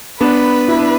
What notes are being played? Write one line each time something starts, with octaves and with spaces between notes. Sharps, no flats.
B3 D4 B4
E4
D4